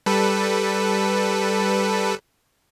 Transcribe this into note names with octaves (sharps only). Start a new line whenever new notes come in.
G3 A4 B4